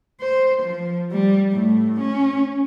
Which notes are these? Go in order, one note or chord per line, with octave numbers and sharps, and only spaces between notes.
C5
F3
G3
A2
C#4